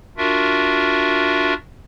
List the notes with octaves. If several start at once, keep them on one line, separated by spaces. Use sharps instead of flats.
D4 F4 F#4 A#4 E5